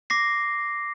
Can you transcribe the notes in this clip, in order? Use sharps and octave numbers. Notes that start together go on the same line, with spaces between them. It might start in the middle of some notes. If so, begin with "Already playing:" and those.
D6 A#6 C7